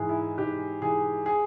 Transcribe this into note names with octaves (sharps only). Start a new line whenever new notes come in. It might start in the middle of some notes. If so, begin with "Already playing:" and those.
Already playing: G#2 E3 G#4
E4
G#2 G4
E3 G#4
G#4